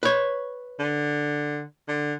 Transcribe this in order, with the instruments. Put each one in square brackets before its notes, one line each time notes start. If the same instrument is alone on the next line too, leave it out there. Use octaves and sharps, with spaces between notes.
[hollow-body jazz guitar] B4 C#5
[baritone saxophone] D3
D3